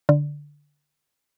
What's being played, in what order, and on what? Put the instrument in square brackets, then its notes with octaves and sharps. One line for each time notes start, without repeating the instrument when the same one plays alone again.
[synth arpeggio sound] D3